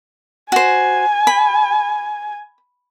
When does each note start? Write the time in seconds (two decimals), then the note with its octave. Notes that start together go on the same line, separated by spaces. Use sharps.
0.52 F#4 C5 G#5
1.27 B5